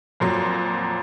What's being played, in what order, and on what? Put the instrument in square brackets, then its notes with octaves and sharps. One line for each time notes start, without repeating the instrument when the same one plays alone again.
[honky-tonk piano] F2 A#2 F#3